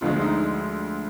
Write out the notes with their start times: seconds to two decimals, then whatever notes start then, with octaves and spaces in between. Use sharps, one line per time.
0.01 D2 D3 F3 G#3 F4
0.21 D#4